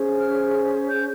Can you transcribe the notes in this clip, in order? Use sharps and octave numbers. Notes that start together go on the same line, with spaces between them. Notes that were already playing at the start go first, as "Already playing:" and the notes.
Already playing: C#4 G#4 C5
F6
G6